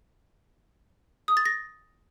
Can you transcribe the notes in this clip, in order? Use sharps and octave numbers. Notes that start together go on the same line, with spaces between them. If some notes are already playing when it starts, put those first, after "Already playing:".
D#6
A6
A#6